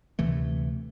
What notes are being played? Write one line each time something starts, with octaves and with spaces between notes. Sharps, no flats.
D2 C3 E3 A3